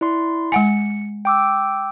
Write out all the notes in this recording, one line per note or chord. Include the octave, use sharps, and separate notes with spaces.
E4 D5 C6
G#3 F#5 G#5 C#7
G5 D6 E6